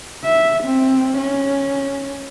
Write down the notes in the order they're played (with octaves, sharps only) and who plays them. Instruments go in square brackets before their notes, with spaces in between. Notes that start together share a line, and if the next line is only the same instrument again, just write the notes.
[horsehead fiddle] E5
C4
C#4